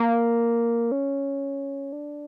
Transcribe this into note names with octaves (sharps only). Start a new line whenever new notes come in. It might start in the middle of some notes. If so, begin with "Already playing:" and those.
Already playing: A#3
C#4
D4